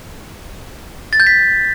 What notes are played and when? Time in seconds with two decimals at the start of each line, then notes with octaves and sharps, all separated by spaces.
1.13 A6
1.20 G6
1.27 B6